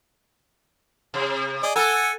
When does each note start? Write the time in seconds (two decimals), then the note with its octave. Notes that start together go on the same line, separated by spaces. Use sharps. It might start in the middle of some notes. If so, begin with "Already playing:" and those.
1.14 C3
1.63 G#4 D5 D#5
1.76 A4 F#5 G#5 E6